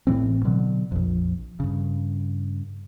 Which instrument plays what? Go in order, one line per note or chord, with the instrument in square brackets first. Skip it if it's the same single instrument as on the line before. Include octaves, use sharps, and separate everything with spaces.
[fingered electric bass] A1 A2 E3 C4
B2 D3 F#3
A#1 F2
G2 C#3